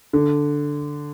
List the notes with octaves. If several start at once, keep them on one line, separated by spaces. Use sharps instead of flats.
D3